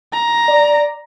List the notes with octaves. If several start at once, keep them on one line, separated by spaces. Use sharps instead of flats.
A#5
D5